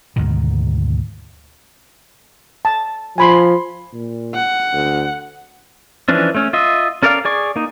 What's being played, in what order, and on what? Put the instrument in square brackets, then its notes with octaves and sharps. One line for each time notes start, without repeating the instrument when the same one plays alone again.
[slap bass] D2 G#2 B2 D#3
[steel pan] A5
[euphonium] F3 [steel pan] G#5 B5 C6
[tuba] A#2
[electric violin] F#5
[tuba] D2
[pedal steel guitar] E3 F3 C#4 D4
A3 C#4
F4 D#5 E5
C#4 A4 A#4 D5 F5
G#4 D5 C#6
A#3 D#4